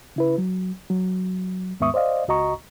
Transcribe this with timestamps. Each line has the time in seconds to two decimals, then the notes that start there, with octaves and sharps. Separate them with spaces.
0.16 C#3 E4 B4
0.38 F#3
0.90 F#3
1.80 D#2 G#2 B3 E5 C#6 D#6
1.94 C5 D5 D#5 F5
2.28 C#2 F#4 D#5 A#5 C#6